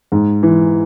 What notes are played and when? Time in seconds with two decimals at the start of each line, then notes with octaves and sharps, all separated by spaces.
0.12 G#2
0.43 E3